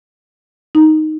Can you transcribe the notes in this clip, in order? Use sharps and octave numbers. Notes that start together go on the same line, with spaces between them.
D#4